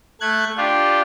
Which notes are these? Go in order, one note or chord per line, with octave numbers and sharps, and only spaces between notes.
A3 F#6 G#6
D4 F4 G4